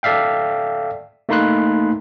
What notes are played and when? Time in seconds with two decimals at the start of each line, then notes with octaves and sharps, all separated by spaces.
0.03 A4 D5 E5 F5 G5
1.29 A3 A#3 D#4 B5 C6 F#6